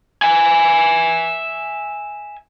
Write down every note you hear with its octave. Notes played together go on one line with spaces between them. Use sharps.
E5 G#5